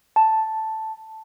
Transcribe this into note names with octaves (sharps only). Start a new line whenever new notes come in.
A5